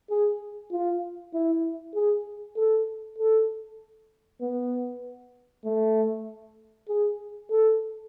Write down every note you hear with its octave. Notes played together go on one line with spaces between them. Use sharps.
G#4
F4
E4
G#4
A4
A4
B3
A3
G#4
A4